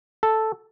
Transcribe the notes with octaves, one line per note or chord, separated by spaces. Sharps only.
A4